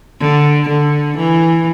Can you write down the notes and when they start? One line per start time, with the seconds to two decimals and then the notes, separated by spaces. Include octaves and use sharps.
0.20 D3
0.68 D3
1.17 E3